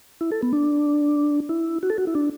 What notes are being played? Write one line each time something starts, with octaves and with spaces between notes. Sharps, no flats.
E4
A4
B3
D4
E4
F#4
A4
F#4
E4
D4